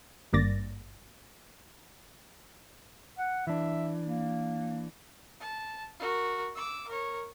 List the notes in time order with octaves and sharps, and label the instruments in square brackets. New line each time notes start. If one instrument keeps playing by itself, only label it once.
[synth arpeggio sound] G#1 G2 A#3 D5 A6 A#6
[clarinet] F#5
[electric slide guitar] E3 D4 [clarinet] E5
[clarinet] A#3
[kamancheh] A5
F#4 A#4
D6 E6
A#4 C#5